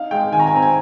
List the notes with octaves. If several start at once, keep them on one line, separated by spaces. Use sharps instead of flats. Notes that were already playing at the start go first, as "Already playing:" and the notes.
Already playing: D#4 F5
G#3 G5
D#3 G#5
A#5
G#5
C4 A#5
G#5